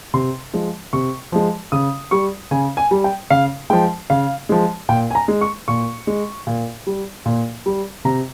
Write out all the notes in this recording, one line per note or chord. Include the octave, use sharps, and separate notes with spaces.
C3 C6
F3 G#3
C3 C#6
F3 G#3
C#3 D#6
G3 C#6
C#3 G#5
G#5
G3
G5
C#3 F5
F3 G#3 G5
C#3 F5
F3 G#3
A#2 G5
G#5
A#5
G#3
C#6
A#2 C#6
G#3
A#2
G3
A#2
G3
C3 A#5